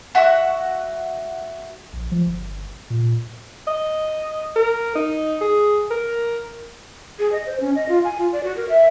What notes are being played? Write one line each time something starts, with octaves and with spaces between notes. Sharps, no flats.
F#4 E5 F#5 C#6
A#1
F3
G1
A#2
D#5
A#4
D#4
G#4
A#4
G#4
D#5
C5
C#4
D#5
F4
G#5
F4
D5
F#4
A#4
E5